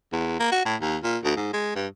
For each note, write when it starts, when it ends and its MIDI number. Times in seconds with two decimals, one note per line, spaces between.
0.13 0.37 40
0.40 0.51 58
0.52 0.64 66
0.65 0.76 45
0.81 0.97 39
1.03 1.18 46
1.24 1.35 38
1.36 1.51 44
1.53 1.71 56
1.76 1.87 43